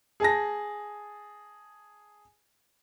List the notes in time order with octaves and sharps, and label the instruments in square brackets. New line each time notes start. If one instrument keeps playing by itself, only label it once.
[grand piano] G#4 A5 A#6